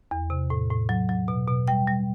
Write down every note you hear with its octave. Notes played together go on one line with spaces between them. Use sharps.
E2
C3
A2
A2
F#3
F#3
B2
B2
G3 G5
G3